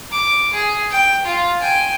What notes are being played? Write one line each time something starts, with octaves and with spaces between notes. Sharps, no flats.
D6
G#4
G5
F4
G5 G#5